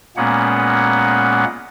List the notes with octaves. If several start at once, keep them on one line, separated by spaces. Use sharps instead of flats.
A#2 G#3 A#3 B3 C#4 F#5